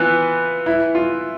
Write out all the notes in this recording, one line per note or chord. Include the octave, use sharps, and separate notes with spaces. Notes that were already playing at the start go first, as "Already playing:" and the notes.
Already playing: E3 B3 F4
E4
F4